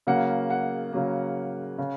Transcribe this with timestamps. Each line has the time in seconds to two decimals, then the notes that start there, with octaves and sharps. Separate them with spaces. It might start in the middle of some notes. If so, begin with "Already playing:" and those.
0.07 C#3 F#3 A#3 F#5
0.50 F#5
0.93 C#3 F#3 A#3
1.78 C#3